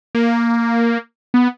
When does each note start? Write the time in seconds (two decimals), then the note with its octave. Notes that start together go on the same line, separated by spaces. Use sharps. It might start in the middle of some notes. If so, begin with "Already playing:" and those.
0.15 A#3
1.34 B3